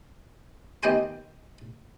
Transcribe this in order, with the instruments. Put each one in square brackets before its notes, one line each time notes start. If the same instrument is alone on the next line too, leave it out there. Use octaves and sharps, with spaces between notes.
[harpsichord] D#2 B3 D#5 G5 G#5 C6